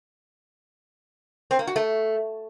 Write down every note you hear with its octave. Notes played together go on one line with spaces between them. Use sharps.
C4
A#3
F#4
A3